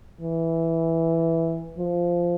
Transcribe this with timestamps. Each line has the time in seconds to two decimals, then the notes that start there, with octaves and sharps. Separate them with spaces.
0.21 E3
1.78 F3